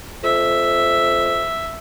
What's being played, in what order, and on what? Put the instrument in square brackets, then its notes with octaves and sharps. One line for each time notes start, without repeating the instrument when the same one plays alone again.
[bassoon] F2 [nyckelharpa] E5